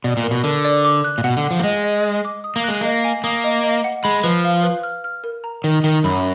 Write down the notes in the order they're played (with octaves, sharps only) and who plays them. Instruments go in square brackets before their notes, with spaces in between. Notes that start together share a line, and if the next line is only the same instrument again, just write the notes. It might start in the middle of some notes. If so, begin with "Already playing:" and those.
[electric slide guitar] B2 [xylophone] D5
[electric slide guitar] A#2
[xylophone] A#4
[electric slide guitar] B2
[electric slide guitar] D3 [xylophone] A#4
[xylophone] D5
D6
F#6
[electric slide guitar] A#2
[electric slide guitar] B2 [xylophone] F#5
[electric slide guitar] D3
[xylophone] F#5
[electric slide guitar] F3
A#3
[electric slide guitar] G#3 [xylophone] D#5
[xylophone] D#5
D#5
D6
D#6
[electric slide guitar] A#3
[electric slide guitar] G#3 [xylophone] F#6
[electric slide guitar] A#3 [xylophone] D#5
[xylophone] G#5
[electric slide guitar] A#3 [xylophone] D#6
[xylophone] D#5
D#5
F#5
[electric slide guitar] G#3 [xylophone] B5
[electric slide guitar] F3 [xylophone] B4
[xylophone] F5
B4
F6
F6
A#4
A#5
[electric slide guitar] D#3 [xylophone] A#4
[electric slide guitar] D#3 [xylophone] A#4
[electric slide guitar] F#2 [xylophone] B5